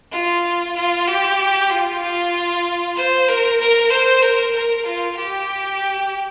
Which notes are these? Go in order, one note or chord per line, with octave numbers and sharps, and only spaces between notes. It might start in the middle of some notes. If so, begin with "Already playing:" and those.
F4
F4
G4
F4
F4
C5
A#4
A#4
C5
A#4
A#4
F4
G4